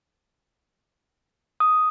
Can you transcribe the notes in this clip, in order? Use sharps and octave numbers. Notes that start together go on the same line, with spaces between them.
D#6